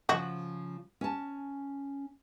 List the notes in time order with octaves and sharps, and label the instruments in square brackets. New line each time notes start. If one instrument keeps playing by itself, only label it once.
[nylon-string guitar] C#3 F3 [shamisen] F#4
[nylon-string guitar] C#4 A5